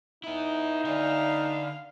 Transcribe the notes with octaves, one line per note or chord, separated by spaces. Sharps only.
B3 D#4 E4
D3 B4 D5 E5 F5 G#5